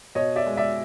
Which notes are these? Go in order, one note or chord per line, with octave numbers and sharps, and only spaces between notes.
B2 C#5 D#5
D5 E5
G#3
D5 E5